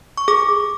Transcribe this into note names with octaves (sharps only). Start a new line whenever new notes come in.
C#6
G#4 D6